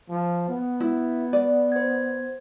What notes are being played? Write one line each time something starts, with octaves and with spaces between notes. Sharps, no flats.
F3
B3
E4
D5
C5 G#6